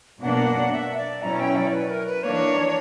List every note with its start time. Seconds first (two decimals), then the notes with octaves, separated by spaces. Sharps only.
0.21 B2 F#3 A#3 D4 F#5
0.73 E5
0.97 D5
1.22 B2 F#3 C#4 E4 A#5
1.40 G5
1.56 D5
1.73 B4
1.90 A#4
2.07 B4
2.23 E3 A#3 D4 C#5